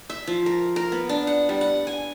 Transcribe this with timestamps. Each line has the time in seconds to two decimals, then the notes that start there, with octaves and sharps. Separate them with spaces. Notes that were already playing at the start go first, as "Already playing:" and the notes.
0.10 E5
0.27 F3
0.46 A#4
0.76 A#4
0.92 B3
1.09 D4
1.27 F#5
1.49 G3
1.61 F#5
1.87 G#5